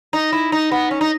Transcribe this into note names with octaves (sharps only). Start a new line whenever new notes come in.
D#4
E4
D#4
B3
C#4
D#4